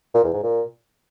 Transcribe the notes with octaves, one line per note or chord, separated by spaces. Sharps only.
A#2
E2
G#2
A#2